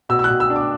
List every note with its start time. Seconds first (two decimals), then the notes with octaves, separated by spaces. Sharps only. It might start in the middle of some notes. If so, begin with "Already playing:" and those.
0.09 B2 E6
0.19 E6
0.24 F#6
0.30 B2
0.40 E6
0.50 D4
0.56 D6